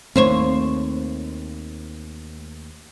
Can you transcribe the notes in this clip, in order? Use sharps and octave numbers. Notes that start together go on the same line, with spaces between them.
D#2 A3 C4 C5 C#5